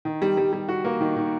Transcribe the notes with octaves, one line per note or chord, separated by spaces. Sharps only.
D#3
G3
G3
G3
F#4
A#3
D#3
D#3